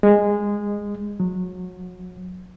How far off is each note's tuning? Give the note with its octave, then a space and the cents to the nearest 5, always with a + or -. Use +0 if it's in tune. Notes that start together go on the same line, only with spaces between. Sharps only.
G#3 -15
F#3 -25